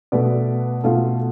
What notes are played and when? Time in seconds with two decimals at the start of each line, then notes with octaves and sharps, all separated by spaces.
0.12 B2 A3 B4 D5
0.84 B2 A3 F4 A4